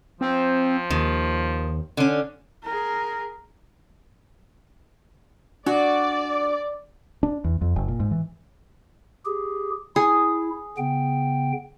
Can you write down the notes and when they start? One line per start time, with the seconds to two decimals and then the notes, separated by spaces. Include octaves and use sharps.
0.21 F3 C4
0.90 D#2 D#3
1.97 D3 C#4
2.64 G#4 A#4
5.66 D4 F#4 D5
7.23 D4
7.44 E2
7.61 F2
7.76 F#1
7.88 A#2
8.00 G#2
8.11 E3
9.25 G4 G#4
9.96 E4 G#4
10.78 C#3 B3 G5